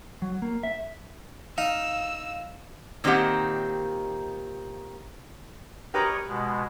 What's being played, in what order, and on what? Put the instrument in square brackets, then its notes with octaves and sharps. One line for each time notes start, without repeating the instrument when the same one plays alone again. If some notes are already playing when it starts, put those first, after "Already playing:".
[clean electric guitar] F#3
A#3
E5
[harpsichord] D#4 [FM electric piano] F5 [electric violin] E6
[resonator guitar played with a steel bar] A#2 D#3 C4 D#4 G4 F#5
[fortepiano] G4 B4 A#5 [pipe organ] A#4 C#5 D#5
[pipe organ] B2 G#3